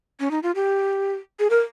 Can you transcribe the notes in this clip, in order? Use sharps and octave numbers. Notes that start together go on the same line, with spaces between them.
C#4
D#4
F4
G4
G#4
A#4